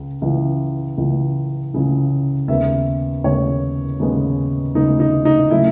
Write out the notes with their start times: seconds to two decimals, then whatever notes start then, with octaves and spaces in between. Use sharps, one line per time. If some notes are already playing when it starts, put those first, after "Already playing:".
Already playing: C#2 C#3
0.22 C#2 C#3 E3
0.97 C#2 C#3 E3
1.74 C#2 C#3 E3
2.48 D#2 C#3 G#3 B3 E5
3.24 D#2 C#3 G#3 B3 C#5
4.00 D#2 C#3 G#3 B3
4.75 D#2 C#3 G#3 B3 D#4
5.00 D#4
5.25 D#4
5.50 C#3 F#3 A3 E4